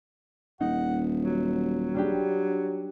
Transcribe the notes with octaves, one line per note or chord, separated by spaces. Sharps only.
D#1 D#4 F#5
F#3
G3 D4 G4